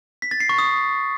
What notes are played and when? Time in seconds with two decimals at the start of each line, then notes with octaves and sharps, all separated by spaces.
0.22 B6
0.31 A6
0.40 C7
0.49 C#6
0.59 D#6